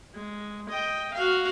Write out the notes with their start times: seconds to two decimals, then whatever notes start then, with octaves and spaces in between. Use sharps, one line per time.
0.14 G#3
0.69 D#5 G5
1.14 F#4 F5